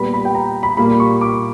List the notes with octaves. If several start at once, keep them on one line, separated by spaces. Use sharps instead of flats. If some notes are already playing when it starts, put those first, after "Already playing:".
Already playing: A#2 G3 B3 B5
B5
G5
A#5
B5
A#2 G3 A#3 B5
C#6
D6